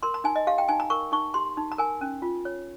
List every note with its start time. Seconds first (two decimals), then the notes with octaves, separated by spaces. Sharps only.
0.03 A#4 C6
0.14 A#5
0.24 D#4 G#5
0.36 D#5
0.47 G4 F5
0.58 G5
0.68 D#4 G#5
0.80 A#5
0.90 A#4 C#6
1.12 D#4 C#6
1.34 G4 C6
1.57 D#4
1.72 A#5
1.78 A#4 G#5
2.01 C#4
2.22 F4
2.45 C#5